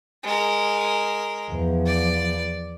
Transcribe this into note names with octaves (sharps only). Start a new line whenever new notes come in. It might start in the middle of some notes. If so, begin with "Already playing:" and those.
G#3 A#4
E2 F3
D5